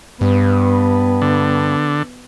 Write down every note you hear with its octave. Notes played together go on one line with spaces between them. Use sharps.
G2 B3
D3